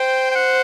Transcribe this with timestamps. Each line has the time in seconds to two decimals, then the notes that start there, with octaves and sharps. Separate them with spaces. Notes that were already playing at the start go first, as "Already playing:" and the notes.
Already playing: C5 G5
0.31 G5
0.36 F#5